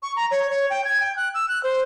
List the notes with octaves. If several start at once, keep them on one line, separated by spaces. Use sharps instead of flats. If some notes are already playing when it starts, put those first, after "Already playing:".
C#6
A#5
C#5
C#5
G5
G#6
G5
F#6
E6
F#6
C5